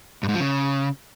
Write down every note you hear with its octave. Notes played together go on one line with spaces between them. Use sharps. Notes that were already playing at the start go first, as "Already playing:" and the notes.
G2
G#2
F3
C#3